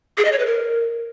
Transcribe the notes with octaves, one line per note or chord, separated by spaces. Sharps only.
G#4
D#5
C#5
B4
A#4